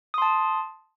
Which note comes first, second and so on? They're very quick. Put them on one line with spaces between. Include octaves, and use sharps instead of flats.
D#6 C6 A5